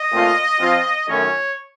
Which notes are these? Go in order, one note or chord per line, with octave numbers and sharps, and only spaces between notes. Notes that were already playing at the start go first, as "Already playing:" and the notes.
Already playing: D#5
A#2 A3 C4 F4
F3 C4 F4
F#2 D#3 A3 C#4 C#5